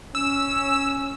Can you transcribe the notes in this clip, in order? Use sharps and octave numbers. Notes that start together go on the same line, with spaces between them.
C#4 E6